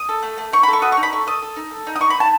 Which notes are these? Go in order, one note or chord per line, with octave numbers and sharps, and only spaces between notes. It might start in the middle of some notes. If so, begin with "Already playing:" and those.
Already playing: D#6
A4
A3
A3
D#4 C#6
B5
A4 C#6
F#4 D#6
C#6
D#4
B5
A4 C#6
A4 D#6
A4
D#4
A4
D#4
D#6
D#4 C#6
B5
D#4 A5